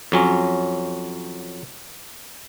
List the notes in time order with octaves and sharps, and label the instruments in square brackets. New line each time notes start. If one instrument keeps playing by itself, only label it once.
[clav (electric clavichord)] F2 F#3 C#4